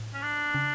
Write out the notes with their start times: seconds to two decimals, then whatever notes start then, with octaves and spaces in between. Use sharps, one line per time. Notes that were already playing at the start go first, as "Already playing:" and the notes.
Already playing: A2
0.14 C#4
0.23 D4
0.54 C#3